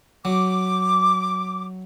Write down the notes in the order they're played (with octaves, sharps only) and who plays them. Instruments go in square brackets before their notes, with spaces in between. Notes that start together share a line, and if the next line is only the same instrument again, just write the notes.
[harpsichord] F#3 [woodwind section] D6